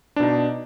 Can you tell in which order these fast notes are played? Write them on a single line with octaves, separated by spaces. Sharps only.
D4 B2 D#4